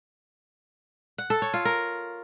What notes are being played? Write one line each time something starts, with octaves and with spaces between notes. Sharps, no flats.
F#5
A4
C#5
F4
A#4